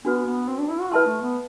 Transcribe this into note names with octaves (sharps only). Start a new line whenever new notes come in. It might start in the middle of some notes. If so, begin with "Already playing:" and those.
B3 D4 F#4 B4
B3
C4
D4
E4
F#4
E4 B4 E5 A5 C6
A3
B3